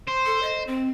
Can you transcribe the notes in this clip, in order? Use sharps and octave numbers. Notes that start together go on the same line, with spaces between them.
C5
A4
D#5
C4